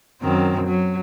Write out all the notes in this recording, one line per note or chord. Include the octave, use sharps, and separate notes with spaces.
F#2 D#3 C4
F#3